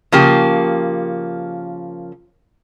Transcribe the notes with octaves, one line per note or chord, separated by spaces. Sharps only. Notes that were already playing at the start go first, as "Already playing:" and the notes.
C#3 F3 A#3 G4